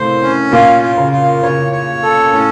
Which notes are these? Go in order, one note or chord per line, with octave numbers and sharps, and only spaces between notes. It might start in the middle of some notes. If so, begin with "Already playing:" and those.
Already playing: A2 C3 A3 A#3 C5
C#4
A#2 A#3 F4
F4
C#3 C#4
F4
C#3 C#4 C#5
C#5
A4
A2 A3 C#4